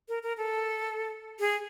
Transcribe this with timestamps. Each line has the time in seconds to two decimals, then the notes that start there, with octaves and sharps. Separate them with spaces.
0.09 A#4
0.23 A#4
0.38 A4
1.40 G#4